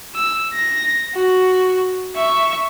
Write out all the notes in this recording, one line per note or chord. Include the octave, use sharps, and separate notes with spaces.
E6
A#6
F#4
E5 C#6